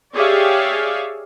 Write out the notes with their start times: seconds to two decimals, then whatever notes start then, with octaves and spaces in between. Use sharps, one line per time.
0.14 G4 G#4 C#5 D5 E5 F5